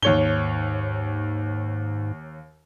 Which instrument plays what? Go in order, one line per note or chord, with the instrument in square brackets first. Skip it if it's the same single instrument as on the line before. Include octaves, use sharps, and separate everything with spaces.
[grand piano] D#2 C#5 G7 [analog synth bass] G#2